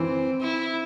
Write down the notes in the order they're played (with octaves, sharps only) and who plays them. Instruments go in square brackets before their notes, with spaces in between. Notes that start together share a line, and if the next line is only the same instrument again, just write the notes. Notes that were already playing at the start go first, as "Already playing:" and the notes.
Already playing: [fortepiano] E3 [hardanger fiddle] C4
[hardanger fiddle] E4